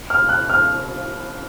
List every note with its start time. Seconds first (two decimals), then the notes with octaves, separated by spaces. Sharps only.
0.10 F6
0.29 F#6
0.50 F6